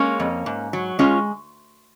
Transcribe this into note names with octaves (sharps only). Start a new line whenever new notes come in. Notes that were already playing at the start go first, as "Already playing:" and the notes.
Already playing: G#3 A#3 C#4
F2
G#2
F#3
G#3 C#4 F4